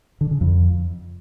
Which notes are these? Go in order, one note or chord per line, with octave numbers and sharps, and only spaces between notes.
D3
C#3
F2